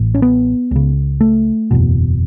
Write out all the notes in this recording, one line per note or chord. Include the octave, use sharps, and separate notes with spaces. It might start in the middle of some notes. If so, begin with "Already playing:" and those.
Already playing: A1 A2
C#4
B3
C#2 C#3
A3
F#1 E2 B2